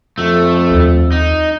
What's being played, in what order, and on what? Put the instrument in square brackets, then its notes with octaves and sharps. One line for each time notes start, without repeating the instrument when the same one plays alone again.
[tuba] F2 [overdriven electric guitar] A3
[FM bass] D#2
[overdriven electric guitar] D#4